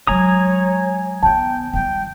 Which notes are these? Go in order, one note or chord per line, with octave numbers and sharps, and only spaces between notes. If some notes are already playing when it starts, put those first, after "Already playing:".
F#3 G#3 C#5 G#5 A#5 D#6
D#3 B3 G5 A5
D#3 G3 G5